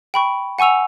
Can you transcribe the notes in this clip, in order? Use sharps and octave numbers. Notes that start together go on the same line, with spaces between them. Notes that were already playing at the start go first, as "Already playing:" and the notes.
G5 B5 C#6
F#5 G#5 C#6 E6 F7